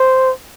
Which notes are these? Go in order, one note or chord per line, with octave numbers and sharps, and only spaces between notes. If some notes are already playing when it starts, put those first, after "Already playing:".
Already playing: C5